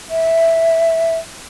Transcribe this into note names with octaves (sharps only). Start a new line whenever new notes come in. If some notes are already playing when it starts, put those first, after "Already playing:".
E5